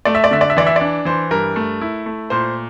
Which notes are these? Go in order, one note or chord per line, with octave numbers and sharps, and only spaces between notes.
A3 D5
E5
D5
D3 E5
D5
E5
E3 D5
E5
D5
D4
E3 C5
G2 A#4
A3
E4
A3
A#2 C5